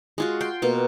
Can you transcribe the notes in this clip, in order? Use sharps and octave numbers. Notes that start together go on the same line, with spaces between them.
G#3 F4 F#4
G5 C6
B2 A#3